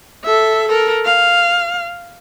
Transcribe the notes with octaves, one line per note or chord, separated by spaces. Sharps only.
A4 E5
A4 A#4
F5